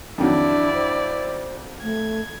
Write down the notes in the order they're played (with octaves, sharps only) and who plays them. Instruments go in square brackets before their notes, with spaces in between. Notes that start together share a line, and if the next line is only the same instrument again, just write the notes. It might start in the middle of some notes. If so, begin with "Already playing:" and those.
[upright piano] F2 D#3 F#3 [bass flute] D4 [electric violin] E4 D5
[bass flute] C5
[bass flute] A3 [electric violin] G#6